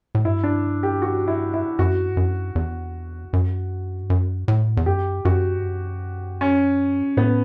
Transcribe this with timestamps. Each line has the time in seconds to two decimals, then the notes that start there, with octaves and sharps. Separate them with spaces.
0.15 A2
0.25 G2 E4
0.43 D4
0.83 G4
1.02 F#4
1.28 E4
1.54 E4
1.79 F#2 F#4
2.09 G2
2.17 F#2
2.55 E2
3.33 F#2
4.03 G2
4.10 F#2
4.48 A2
4.77 E2
4.86 F#2 G4
5.25 F#2 F#4
5.57 G2
5.64 F#2
6.41 C#4
7.17 A2 B3